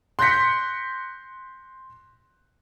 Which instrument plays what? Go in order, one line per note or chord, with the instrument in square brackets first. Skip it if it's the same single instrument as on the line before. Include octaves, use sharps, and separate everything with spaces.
[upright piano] C6 F#6 G6 A#6 B6 C#7